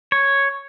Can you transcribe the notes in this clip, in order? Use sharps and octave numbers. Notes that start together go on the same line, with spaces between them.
C#5